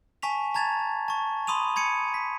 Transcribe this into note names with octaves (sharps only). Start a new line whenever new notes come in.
G#5 A5 C#6 B6 F7
A5 A#5 G#6 A6 F7
A5 C#6
B5 C6 D#6 D#7 F7
B5 G#6 C#7 D#7
B6